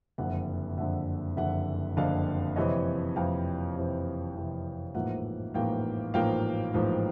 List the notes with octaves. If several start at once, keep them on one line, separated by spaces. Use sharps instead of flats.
F#1 F2 D3 E5 F#5
F#1 F2 D3 E5 F#5
F#1 F2 D3 E5 F#5
F#1 F2 D3 D#5 F5
F2 C3 E3 C#5 D#5
F2 C3 E3 F5 G5
F2 C3 E3
F2 C3 E3
A1 G#2 F3 A#3 E5 F#5
A1 G#2 F3 A#3 F5 G5
A1 G#2 F3 A#3 F5 G5
A1 G#2 F3 A#3